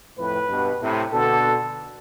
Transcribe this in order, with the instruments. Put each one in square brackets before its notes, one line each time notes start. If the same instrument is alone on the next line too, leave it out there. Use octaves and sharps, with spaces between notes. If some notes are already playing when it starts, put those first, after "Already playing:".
[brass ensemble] F2 A2 [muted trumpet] B4
[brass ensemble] G2 B2
A2 C3
[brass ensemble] B2 D3 [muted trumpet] A4